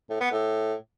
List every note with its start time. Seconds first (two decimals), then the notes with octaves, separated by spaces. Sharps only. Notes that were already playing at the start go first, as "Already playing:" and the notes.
0.10 A2
0.21 B3
0.32 A2